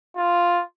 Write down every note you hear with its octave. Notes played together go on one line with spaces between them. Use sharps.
F4